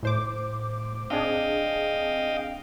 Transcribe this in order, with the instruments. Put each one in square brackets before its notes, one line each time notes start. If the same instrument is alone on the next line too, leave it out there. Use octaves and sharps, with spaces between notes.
[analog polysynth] A2 C5 D6
[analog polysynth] C4 D4 G#4 [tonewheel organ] D#5 F5 G5